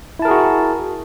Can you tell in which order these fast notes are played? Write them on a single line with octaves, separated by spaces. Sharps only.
E4 A5 A#4 G#4 F#4